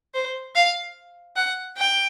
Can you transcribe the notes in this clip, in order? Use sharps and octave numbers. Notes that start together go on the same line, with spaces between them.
C5
F5
F#5
G5